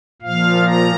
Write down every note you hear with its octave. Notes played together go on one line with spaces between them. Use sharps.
A#2 F3 F5
A#5